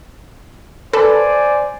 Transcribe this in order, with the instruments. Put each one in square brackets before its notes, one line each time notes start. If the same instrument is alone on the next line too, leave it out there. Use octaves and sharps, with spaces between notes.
[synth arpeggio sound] A4 B4 [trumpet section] C5 D5 G#5